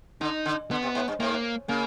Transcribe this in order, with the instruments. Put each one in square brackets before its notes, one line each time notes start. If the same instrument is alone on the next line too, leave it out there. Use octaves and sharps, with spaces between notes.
[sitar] D3 [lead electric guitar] D#4
[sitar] D3
[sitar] D3 [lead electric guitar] B3
[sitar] C3
G#2
G2
[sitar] G#2 [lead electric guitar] A#3
[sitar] C#3 [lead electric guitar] A#3